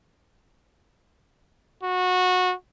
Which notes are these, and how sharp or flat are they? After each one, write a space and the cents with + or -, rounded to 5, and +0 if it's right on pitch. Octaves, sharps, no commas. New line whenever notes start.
F#4 -20